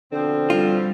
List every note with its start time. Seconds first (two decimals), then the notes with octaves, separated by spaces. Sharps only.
0.12 B2 D3 F3 C4
0.50 G3 F4